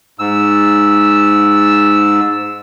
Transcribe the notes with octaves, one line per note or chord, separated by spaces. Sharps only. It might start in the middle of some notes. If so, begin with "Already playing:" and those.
G#2 E6